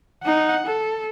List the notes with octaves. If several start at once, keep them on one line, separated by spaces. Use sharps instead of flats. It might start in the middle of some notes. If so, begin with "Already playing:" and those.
D#4 F#5
A4